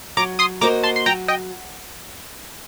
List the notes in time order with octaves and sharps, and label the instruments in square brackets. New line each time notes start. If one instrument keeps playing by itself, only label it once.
[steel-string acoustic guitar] F#3 [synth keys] A#5 D6
[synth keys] C6 D#6
[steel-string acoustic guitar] A#3 F#4 C5 D#5 [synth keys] A#5 D6
[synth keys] A5 C6
C6
[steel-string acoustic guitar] F#3 [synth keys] G5 A#5
[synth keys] D#5 G5